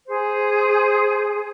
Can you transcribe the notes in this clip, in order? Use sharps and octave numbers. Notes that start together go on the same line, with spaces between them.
G#4 C5